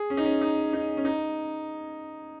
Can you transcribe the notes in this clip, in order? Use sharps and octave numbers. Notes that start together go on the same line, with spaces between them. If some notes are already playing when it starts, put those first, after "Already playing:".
Already playing: G#4
C#4
D#4
C#4
D#4
D#4
C#4
D#4